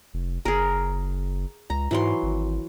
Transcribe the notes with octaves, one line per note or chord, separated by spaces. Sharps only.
F1
F#1 G#4 A#4
C#2 A#5
G#2 E3 F#3 C6
G#1